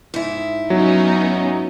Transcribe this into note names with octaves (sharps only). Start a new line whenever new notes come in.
G#2 E4
F#3 B3 C#4 D#4